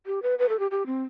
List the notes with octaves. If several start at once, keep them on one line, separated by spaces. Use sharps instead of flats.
G4
B4
B4
A4
G4
G4
C4